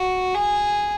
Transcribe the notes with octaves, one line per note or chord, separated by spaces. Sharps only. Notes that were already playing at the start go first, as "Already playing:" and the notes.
Already playing: F#4
G#4